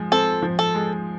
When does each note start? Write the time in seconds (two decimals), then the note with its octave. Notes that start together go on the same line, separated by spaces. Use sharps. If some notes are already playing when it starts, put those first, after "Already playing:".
Already playing: F3 G#3
0.12 C4 A4
0.42 F3
0.59 A4
0.75 G#3